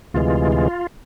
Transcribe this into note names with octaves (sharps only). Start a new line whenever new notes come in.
D2 C3 E3 G#3 F4
F4